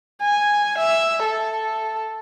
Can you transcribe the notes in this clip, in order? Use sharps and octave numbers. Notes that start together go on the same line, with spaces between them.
G#5
E5
A4